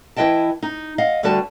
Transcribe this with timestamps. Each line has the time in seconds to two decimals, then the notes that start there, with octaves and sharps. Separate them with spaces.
0.16 E3 E4 B4 D#5 G5 A5
0.63 D#4
0.98 D#5 F5 F#5
1.23 D2 D3 G3 F#4 B4 A5